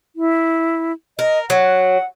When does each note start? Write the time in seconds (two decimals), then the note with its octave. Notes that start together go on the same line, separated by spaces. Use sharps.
0.16 E4
1.19 A#4 D#5
1.50 F#3 F#5